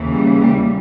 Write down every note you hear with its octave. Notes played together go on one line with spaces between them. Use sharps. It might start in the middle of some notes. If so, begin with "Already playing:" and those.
Already playing: D#2 C#3 E3
G3
G3